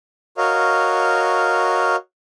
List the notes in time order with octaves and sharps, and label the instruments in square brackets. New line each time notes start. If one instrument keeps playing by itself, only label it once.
[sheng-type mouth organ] F#4 A#4 C#5 D#5 F5